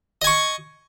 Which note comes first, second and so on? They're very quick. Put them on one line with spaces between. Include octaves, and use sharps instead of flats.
D#5 G#5 C#6